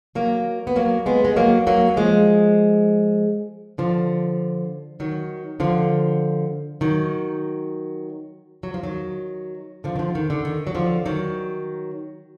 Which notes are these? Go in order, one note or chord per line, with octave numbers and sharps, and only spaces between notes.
F#3 A#3
B3
F#3 A#3
G#3 B3
G#3
F#3 A#3
F#3 A#3
F3 G#3
D3 F3
D#3 F#3
D3 F3
D#3 F#3
F#3
F3
D#3 F#3
D3 F3
D#3
D3 F3
D#3
D3
D#3
F#3
D3 F3
D#3 F#3